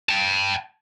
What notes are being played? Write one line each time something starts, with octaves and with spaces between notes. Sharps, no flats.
G5 A5